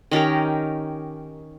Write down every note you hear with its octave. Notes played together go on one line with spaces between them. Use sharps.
D#3 C#4 G4 A#4